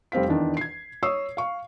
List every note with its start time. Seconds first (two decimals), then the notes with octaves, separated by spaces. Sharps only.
0.12 F1 G3 C4 F5 B6
0.29 E2 D#3 D4
0.57 G#6 C7
1.03 C#5 C#6 D#6 E6 C7
1.37 F5 C#6